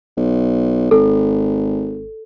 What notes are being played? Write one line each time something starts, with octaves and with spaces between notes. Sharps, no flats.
B1
G#1 A4